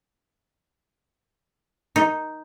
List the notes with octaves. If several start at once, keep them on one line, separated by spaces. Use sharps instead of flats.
D#4